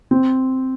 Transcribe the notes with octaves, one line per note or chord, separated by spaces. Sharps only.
C4